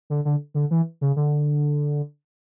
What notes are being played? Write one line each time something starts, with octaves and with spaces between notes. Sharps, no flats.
D3
D3
D3
E3
C#3
D3